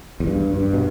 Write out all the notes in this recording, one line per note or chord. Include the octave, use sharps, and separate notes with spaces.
E2
G2
G2
B2